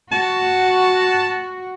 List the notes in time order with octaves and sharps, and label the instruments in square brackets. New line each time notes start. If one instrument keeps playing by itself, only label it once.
[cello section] F#4 [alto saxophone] A5